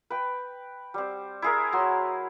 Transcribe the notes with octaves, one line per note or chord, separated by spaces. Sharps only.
B4 G5
G3 C4
E4 G#4 A#4
F#3 C6